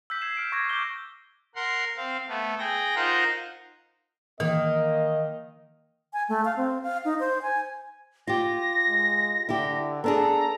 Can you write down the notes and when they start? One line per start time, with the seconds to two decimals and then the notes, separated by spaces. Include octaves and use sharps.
0.10 E6 F#6 G6 B6
0.22 G#6 C7 E7
0.36 E6 F6 D7 E7
0.52 C#6 D6 G#6 A#6 B6
0.69 D6 E6 G6 G7
1.55 A#4 F#5 C6
1.97 C4 F5
2.28 A3 B3
2.59 G#4 G5 A#6
2.96 D#4 F4 A#4 C5 F#5 A#5
4.40 D#3 E3 A#3 D#5
6.13 G#5
6.29 A3
6.45 F5
6.57 C4
6.82 F5
7.05 D#4
7.20 C5
7.42 G#5
8.27 F4 G4 A#6
8.88 G#3
9.49 D3 E4 G4
10.04 B3 D4 G#4 A4 A#5